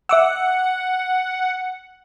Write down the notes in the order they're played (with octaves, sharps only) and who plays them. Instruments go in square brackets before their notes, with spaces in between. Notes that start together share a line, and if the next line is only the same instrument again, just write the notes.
[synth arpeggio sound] E5 D6 E6 [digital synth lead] F#5